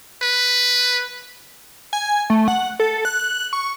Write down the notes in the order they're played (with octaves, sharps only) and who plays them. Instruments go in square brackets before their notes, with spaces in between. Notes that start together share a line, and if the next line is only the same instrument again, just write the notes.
[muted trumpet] B4
[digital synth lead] G#5
A3
F#5
A4
F#6
C#6